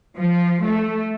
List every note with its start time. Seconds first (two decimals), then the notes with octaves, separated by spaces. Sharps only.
0.16 F3
0.64 A3